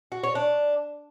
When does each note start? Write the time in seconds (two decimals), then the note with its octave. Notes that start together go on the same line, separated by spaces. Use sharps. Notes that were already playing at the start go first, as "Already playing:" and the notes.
0.12 F#4
0.23 C#5
0.35 D4